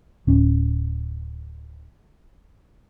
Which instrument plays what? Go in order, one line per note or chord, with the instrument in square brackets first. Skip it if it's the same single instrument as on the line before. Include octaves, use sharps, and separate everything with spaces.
[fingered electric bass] D1 C#4